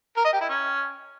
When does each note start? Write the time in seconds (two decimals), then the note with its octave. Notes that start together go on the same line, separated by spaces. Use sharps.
0.17 A#4
0.25 D#5
0.33 G4
0.41 E4
0.49 C#4